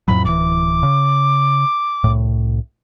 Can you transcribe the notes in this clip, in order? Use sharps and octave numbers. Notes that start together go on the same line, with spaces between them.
F2 A2 F#3 B5
D1 E3 D6
C#3
C2 A2